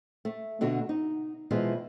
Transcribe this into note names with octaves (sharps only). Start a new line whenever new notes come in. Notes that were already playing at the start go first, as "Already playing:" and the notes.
A3
B2 D3 A3 F#4
D#4
B2 E3 F3 G#3 B3